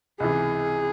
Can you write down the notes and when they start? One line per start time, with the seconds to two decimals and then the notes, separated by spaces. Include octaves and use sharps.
0.20 C#2 C3 E3 G#4